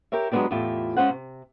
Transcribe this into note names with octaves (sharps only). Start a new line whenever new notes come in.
G4 A#4 C#5 E5
F#3 G#3 B3 C4 D4 G4
E2 A2 F4 G4 E5
G#3 C#4 F4 C5 F#5
C3